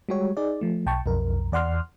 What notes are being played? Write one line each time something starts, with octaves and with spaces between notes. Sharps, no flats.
G3 G#3 F#4 G4 C#5
D#4 G#4 D5
F3 A3
B1 G5 A5 C#6
B1 F2 A#4
E2 D5 F#5 C6 F6